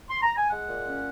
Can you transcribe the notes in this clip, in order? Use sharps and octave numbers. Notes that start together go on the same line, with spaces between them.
C6
A#5
G#5
G#3 F#5
A#2
C#4